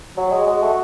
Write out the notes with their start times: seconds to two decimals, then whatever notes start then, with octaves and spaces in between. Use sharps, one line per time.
0.17 F#3 F#4
0.32 G#3
0.47 G#3
0.62 A3